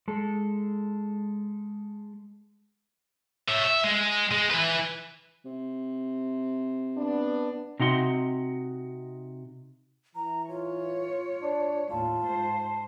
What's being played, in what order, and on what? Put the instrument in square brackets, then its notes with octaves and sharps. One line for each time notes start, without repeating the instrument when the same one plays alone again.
[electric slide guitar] G#3 A4
[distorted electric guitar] C#5 E5
E5
G#3
G#3
E3 B4
[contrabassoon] C3
[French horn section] B3 D4
[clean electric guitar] C3 D#4 F#4 C6
[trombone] E3 [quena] A#5
[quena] F4 [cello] C#5
[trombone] D4
[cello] D#2 A2 [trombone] F4 [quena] A5
[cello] G#2 C5